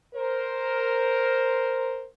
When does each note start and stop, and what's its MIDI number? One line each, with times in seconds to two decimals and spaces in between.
0.15 2.07 70
0.15 2.07 72